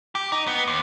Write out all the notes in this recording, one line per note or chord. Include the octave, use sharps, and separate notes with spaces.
G4
D#4
B3
D#2